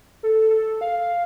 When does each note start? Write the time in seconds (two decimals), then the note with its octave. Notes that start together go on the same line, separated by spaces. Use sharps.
0.23 A4
0.50 A4
0.81 F5